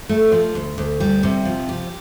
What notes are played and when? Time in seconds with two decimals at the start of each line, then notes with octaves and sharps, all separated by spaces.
0.09 A3
0.32 F3
0.55 D2
0.78 D2
1.00 G3
1.23 C3
1.45 F3
1.69 G4